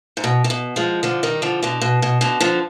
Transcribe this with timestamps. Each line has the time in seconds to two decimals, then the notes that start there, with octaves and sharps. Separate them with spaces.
0.17 G#2
0.24 B2
0.44 C3
0.50 B2
0.76 F3 G#3
1.03 D3 F3
1.23 D#3 G3
1.42 D3 F3
1.62 B2 D3
1.81 B2
2.02 B2
2.21 B2 D3
2.40 D3 F3